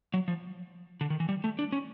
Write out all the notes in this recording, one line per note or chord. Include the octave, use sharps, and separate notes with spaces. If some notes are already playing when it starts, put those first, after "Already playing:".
F#3
F3
D3
D#3
E3
G3
A3
D4
C#4